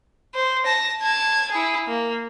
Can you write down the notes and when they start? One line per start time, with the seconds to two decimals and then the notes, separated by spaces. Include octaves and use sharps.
0.35 C5
0.65 A5 A#6
1.02 A5 G#6
1.51 E4 G#4
1.87 A#3